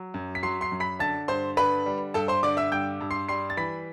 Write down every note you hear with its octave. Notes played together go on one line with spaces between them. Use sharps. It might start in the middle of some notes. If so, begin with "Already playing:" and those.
Already playing: F#3
F#2
B6
F#3 C6 C7
C6 C7
F#2
B5 B6
D3 A5 A6
G2 C5 C6
D3 B4 B5
G3
G2 A4 A5
C5 C6
D3 D5 D6
E5 E6
G2 G5 G6
G2
C6 C7
G3 C6 C7
A6
E3 B5 B6